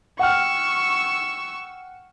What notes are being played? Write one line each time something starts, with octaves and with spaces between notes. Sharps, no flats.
F#5 G5 C#6 E6 F6